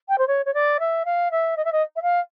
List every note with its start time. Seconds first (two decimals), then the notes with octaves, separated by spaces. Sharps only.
0.08 G5
0.18 C5
0.27 C#5
0.45 C#5
0.54 D5
0.79 E5
1.05 F5
1.31 E5
1.56 D#5
1.65 E5
1.72 D#5
1.96 E5
2.02 F5